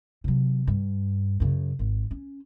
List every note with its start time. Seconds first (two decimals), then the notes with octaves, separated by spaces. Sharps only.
0.24 C3 F#3
0.67 G2
1.40 F#2 C#3
1.79 G#1
2.11 C#4